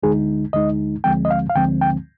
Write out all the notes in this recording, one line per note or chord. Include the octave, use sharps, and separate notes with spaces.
D2 D3 G#3 D#4 G#4
D2 D3 G#3 D#4 D#5
D2 D3 F3 G#3 C4 G5
D#5
F5
F5
D2 D3 F3 G#3 C4 G5
G5